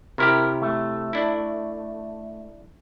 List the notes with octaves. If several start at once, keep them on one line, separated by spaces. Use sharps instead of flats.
C3 E4 G4 A#4
A3
D4 E4